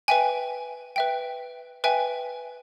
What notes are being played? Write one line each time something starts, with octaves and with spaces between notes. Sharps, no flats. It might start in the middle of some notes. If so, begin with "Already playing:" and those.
B4 E5 G5 G#5
B4 E5 G5
B4 E5 G5 G#5